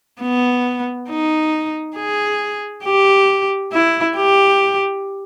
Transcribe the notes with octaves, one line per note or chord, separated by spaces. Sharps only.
B3
D#4
G#4
G4
E4
G4